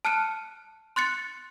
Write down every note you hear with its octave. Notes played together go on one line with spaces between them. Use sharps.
A5 F6 F#6 C#7 D#7
C6 F#6 A6 C#7